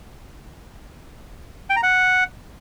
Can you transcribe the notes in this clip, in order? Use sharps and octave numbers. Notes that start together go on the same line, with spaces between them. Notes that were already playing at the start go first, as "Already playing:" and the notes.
G5
A#5
F#5